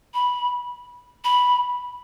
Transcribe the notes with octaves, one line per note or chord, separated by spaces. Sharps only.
B5
B5